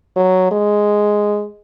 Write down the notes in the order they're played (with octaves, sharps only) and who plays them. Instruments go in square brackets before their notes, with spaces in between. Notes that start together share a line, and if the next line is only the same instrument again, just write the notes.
[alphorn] F#3
G#3